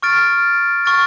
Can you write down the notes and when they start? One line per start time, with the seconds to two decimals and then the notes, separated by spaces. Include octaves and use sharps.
0.02 C#6 F6 A6 D7
0.85 C#6 F6 A6 D7